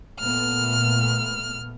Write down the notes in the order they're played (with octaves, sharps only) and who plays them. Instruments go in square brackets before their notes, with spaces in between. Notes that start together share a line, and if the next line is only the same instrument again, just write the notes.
[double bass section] A#2 A3 B3 [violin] F6